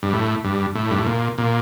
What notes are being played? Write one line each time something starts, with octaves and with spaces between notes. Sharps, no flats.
G2
A2
G2
A2
G2
A2
A#2
A#2